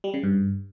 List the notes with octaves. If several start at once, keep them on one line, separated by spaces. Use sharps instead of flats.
G3
C#3
G2